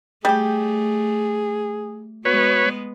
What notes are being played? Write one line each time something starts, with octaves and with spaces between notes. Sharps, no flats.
G3 A3 G4 G#4
G#3 B3 F#4 B4 C#5